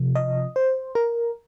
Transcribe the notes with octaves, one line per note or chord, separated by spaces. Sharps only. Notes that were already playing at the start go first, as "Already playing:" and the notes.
Already playing: C3 F3
D#5
C5
A#4